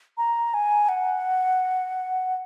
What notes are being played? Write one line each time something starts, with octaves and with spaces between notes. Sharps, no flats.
A#5
G#5
F#5